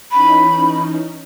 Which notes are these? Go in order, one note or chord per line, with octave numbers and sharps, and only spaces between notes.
E3 C#4 D#4 B5